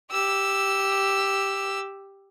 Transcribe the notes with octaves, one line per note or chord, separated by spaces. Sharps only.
G4 E6